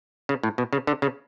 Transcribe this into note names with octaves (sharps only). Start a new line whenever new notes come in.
C#3
A2
B2
C#3
D3
C#3